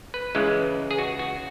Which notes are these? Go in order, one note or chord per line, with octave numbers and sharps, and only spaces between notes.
B4
C#2 C#3 E3 G#3
G#4
F#4
F#4